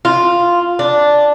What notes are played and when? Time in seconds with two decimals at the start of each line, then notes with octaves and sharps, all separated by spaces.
0.05 F4
0.79 D4